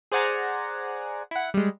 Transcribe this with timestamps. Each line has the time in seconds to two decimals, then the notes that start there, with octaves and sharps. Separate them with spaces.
0.12 G#4 C5 D5 F#5 G#5 A#5
1.31 E4 F#5
1.54 G3 G#3